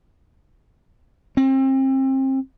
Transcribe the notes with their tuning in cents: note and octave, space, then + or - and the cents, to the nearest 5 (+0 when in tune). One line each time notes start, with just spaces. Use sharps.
C4 +30